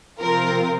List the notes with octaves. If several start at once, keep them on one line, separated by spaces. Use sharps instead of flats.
C3 F3 C4 F4 A#4